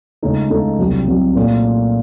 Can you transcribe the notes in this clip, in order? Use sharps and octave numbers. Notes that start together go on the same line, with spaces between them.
C#2 C#3 A3 D#4 A4
C#2 C#3 A3 D#4 A4
C2 C3 F#3
C2 C3 F#3
A#2 A3 C#4